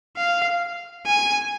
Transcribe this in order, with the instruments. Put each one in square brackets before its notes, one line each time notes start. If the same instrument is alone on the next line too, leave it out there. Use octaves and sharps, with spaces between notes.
[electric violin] F5
G#5